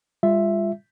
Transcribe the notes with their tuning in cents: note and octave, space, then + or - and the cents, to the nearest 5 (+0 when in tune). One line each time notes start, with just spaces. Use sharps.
G3 +45 F4 +0 E5 +5